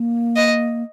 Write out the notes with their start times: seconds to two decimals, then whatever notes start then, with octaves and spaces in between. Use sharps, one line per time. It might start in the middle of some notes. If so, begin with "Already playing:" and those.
Already playing: A#3
0.36 D#5